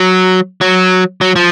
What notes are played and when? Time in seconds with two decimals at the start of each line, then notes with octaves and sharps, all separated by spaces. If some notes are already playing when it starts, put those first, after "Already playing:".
Already playing: F#3
0.61 F#3
1.21 F#3
1.36 F3